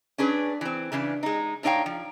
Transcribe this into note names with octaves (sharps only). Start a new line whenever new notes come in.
C#4 D4 G#4 B4
E3 C4
C#3 E3 D4 B4
G#3 D#4
A2 D4 D#4 C#5 F5 G5
F3